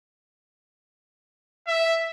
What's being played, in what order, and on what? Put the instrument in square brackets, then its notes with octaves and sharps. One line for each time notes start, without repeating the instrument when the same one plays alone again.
[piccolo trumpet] E5